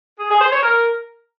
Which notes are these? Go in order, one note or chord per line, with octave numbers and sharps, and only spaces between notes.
G#4
G#4
C5
C#5
A#4